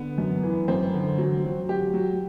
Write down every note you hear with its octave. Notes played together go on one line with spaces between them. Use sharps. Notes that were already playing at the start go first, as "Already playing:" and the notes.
Already playing: D3 B3
F#2
E3
F#2 C4
D3
F#3
F#3
F#3 G4
F#3